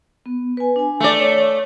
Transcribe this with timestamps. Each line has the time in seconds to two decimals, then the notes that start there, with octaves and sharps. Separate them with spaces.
0.26 B3
0.57 B4 G#5
0.76 D4 G#5
1.00 A3 D5
1.19 C#5